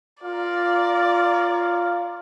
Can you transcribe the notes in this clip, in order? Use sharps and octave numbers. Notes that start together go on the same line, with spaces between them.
F4 A#4 D5 F5